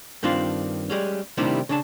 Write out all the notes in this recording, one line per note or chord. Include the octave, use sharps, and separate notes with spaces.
G2 D#3 C4 D4 F4
G3 G#3 C#4
C3 D#3 G3 A3 D4 E4
C#3 D4 A5